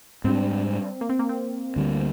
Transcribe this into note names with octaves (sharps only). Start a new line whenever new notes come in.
G#2 G3 C4 D4
A#3
C4
A#3
C4
D2 D3 G3